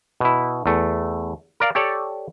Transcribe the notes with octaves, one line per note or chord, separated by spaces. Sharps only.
B2 E4
E2 A3
A#4 D5 F5
G4 A4 C#5 D5